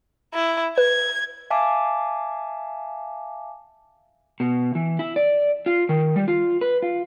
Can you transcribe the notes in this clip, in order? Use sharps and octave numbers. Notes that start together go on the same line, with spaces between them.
E4
B4 G#6
E5 F5 G#5 A5 D6
B2
E3
E4
D5
F4
D#3
G3
F4
B4
F4